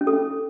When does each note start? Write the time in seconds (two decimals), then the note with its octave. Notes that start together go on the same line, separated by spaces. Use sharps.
0.01 C#4
0.07 A4
0.13 C#4